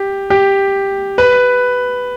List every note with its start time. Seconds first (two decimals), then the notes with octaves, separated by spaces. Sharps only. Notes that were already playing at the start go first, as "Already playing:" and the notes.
Already playing: G4
0.30 G4
1.18 B4